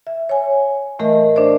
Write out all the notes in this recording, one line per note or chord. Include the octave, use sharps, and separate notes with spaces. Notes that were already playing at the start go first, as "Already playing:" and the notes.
E5
C#5 G#5
A2 E3 A3 A#4 D#5 E5
D4 A#4 C5 D5